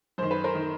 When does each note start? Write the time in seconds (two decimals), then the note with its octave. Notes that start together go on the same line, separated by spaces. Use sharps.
0.18 F#2 D#3 C5
0.31 B4
0.44 A#4 C5
0.55 D#3